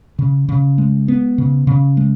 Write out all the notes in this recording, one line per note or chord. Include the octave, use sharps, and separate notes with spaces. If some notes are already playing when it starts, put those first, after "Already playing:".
C#3
C#3
G#3
B3
C#3
C#3
G#3